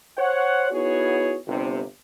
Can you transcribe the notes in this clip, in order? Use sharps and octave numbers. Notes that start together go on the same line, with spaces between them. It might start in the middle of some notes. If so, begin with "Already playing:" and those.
C5 C#5 F#5
B3 D#4 E4 F#4 G#4 C#5
G1 C3